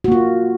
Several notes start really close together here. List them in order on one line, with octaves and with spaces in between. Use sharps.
F#4 A#3 F4